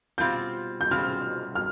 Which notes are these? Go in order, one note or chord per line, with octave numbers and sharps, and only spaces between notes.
B2 G3 C4 F4 G6
G6
B2 G3 C4 F4 F6
F6